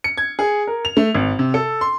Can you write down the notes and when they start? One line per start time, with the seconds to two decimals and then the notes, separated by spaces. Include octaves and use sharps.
0.04 C#7
0.18 G#6
0.39 G#4
0.67 A#4
0.85 F7
0.97 A3
1.15 G#1
1.39 C3
1.54 A4
1.81 C6